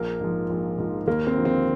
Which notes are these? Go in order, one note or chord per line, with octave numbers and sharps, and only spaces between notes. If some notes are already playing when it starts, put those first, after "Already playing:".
Already playing: A#1 A#3
G#2 F3
A#1
G#2 F3
D#2 A#3
C4
D3 F3
C4